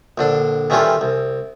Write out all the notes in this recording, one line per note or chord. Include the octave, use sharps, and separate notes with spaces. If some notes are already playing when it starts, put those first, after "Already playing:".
A#1 D3 D4
D#3 E3 G3 C#4 F4 A4
C2